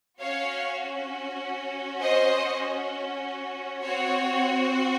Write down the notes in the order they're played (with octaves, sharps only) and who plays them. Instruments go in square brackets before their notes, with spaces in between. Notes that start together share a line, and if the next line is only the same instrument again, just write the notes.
[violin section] C#4 F#4 C#5 F5
C5 D#5
C4 F#4 C#5